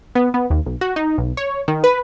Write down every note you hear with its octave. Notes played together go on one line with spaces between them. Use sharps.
B3
B3
D#2
B1
F#4
D#4
B1
C#5
D#3
B4